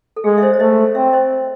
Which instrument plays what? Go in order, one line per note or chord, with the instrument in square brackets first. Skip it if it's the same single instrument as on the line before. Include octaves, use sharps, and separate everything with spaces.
[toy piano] A4
[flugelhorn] G#3 [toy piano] G#4
[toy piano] E5
C5 D#5
C#5
[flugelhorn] A3 [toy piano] C5 D#5
[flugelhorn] C4 [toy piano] C#5 E5
[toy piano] C5 D#5